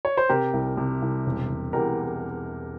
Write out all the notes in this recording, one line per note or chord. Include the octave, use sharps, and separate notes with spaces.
C#5
C5
C3 G4 A#4
C2
C3
C2
E1
E1
E2 G4 A#4